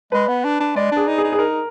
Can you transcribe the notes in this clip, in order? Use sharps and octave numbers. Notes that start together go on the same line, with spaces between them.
G#3 B4
B3
D4
D4
G#3 D5
D4 G#4
D#4
G#4
D#4
G#4
D#4 A#4